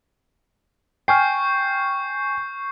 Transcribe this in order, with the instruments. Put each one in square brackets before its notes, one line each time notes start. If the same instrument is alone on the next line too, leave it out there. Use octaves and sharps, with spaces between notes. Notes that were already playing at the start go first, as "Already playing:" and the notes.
[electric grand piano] G5 G#5 F6 [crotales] C#6 G6 C7